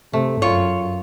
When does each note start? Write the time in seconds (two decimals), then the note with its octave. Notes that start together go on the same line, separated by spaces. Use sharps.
0.13 C3 A3
0.42 F#2 F4 C#5